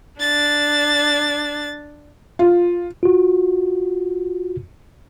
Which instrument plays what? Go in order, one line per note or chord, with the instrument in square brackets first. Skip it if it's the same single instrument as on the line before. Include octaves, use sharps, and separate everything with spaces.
[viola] D4 [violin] A6
[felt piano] F4
[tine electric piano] F4 F#4